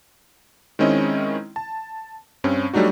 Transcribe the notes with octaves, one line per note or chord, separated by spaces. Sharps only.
D#3 G#3 C4 C#4 E4 D#5
A5
G2 C4 C#4
F#3 G3 A3 D4 D#4 F#4